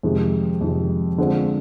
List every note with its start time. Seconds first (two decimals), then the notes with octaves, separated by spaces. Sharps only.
0.03 F2 C3 D#3 G#3
0.61 F2 C3 D#3 G#3
1.18 D3 G#3 C4 F4